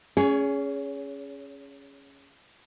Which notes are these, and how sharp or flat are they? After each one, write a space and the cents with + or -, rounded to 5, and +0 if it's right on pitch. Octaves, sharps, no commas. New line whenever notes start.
C#4 +0 G#4 +0 C#5 +30